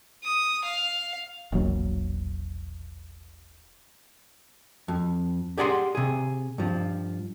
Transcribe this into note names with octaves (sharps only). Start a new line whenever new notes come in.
D#6
F5
E1 A#1 F#3 A#3
F2
G4 G#4 D5 F#5 B5 C6
C3 G#4
G2 F3